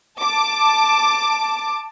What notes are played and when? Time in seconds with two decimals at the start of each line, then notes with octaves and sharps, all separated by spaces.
0.20 A5 D6